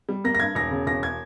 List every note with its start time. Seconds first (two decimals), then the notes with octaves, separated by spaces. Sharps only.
0.09 G3
0.24 A#3 A#6
0.35 A#6
0.40 G2 G#6
0.55 E1 A#6
0.71 C#3
0.87 E1 A#6
1.03 G#6